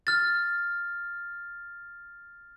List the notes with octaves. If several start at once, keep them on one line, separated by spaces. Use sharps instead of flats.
F6 A6